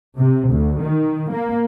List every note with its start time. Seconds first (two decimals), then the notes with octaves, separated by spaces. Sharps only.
0.18 C3
0.48 D2
0.79 D#3
1.30 A#3